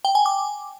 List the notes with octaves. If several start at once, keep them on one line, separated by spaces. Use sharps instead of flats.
G5
G#5
D6